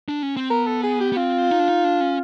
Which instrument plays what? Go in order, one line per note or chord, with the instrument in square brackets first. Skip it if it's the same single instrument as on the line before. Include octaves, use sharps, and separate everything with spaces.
[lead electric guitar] D4
C#4
C4
[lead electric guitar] B3 [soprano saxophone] A#4
[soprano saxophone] A4
G#4
G4
[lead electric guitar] B3
[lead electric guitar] C4 [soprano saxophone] F4
[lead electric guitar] D#4
D4
D#4
D4
C#4